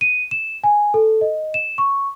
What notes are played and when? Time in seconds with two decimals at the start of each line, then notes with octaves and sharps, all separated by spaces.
0.01 D#7
0.31 E7
0.64 G#5
0.94 A4
1.21 D#5
1.54 E7
1.78 C#6